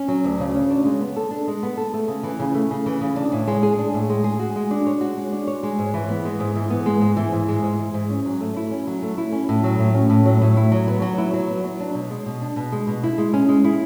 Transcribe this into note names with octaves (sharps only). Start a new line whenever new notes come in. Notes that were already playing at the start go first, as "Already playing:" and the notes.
Already playing: C#4
F#3
D2
C#3
C#4
D4
G#3
B3
A4
D4
G#3
B3
A4
A3
C#3
E3
C#3
A3
C#3
E3
C#3
D4
A2
G#3
G#4
D4
A2
G#3
G#4
F#4
G#3
D4
C#5
F#4
G#3
D4
C#5
G#3
G#2
E3
B3
G#3
G#2
E3
B3
G#3
G#2
E3
G#2
G#3
G#2
E3
G#2
C#4
F#3
A3
E4
C#4
F#3
A3
E4
C#4
A2
F#3
A2
C#4
A2
F#3
A2
E4
F#3
B3
F#3
E4
F#3
B3
F#3
D4
B2
G#3
B2
D4
B2
G#3
B2
E4
G#3
C#4
G#3
E4